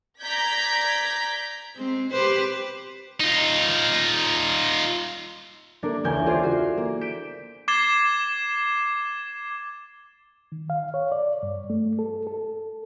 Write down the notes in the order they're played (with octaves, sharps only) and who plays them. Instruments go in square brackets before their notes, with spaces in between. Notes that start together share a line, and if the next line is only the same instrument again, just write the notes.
[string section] D5 A#5 G6 G#6 B6
[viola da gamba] G#3 C4
G4 B4 C5
[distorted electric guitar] D#4 F4
[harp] A#3 D4 A4 A#4
E1 C#2 A#4 G#5 G6
F4 G#4 A4 C5 D5
F#4 C7
A#3
G6 B6 D7 E7
[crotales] D6 G#6 A6 C7 E7 G7
[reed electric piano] D#3
F5
C#5
D5
G2
A3
A4
A4